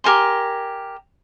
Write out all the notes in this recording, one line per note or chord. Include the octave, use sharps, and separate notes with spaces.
G4 A#4 G#5 C6